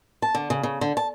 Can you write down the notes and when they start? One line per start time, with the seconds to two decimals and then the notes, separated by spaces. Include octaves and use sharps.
0.22 A5
0.35 D3
0.50 C#3
0.63 C#3
0.81 D3
0.97 A5